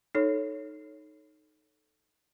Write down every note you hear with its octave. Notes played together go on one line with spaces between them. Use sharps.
D#4 A4 C#5